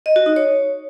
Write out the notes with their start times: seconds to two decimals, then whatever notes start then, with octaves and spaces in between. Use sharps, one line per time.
0.06 D#5
0.16 F#4
0.26 D#4
0.36 C#5